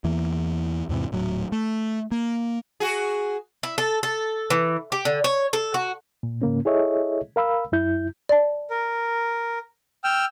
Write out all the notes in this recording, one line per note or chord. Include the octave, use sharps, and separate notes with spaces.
E2 E3 A#3
E2 G#2 C3 E3
D#1 A2 F#3
A3
A#3
F#4 G#4
E4
A4
A4
E3
G4
D3
C#5
A4
F#4
A#2
G#2 C#3 A#3 C#4
E4 G#4 A4 C#5 D#5 E5
A#4 F5 B5 E6
F#2 E4 G6
D5 A5
A#4
G5 E6 F6